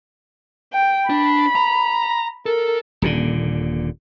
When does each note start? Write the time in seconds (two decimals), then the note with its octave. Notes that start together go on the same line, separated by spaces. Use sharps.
0.73 G5
1.10 D4 B5
1.55 A#5
2.46 A4 A#4
3.02 D#1 A#2 D3